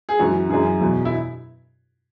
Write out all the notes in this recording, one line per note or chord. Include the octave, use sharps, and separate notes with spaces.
G#4
F#2 E3 F#4
F#2 E3 G#4
E2 B2
E4